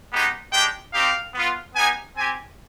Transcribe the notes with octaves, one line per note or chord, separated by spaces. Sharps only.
G#3 B3 D#4 G4
G#3 D4 G4 G5
C4 D#4 G4 F5
B3 F4
B3 D#4 G4 G#5
C4 G4 G#5